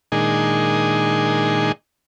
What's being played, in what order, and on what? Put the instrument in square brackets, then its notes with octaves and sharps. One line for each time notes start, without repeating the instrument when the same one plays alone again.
[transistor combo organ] A#2 D#3 G#3 D4 D#4 G#4